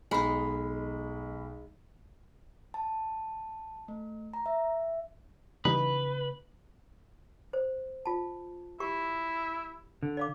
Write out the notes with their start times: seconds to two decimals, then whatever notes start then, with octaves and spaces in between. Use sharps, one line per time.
0.11 B1 G#3 D#4 B5
2.74 A5
3.88 A3
4.34 A#5
4.46 E5
5.65 C#3 E3 G3 A#3 D#4 B4
7.53 C5
8.06 F4 A5
8.80 E4 G4 C#6
10.03 D3
10.17 D5 F5 D6